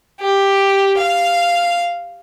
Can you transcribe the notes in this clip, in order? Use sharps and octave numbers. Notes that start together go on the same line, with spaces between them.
G4
F5